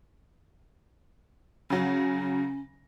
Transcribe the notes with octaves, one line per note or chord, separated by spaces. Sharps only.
C#3 F#3 C#4